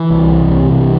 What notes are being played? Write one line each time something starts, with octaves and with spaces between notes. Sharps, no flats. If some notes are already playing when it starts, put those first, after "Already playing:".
Already playing: E3
C2
C2
C3
C3